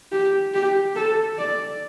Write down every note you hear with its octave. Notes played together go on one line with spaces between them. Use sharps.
G4
G4
A4
D5